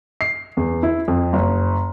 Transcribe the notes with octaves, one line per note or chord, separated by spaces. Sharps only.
C7
E2
E4
F2
F#1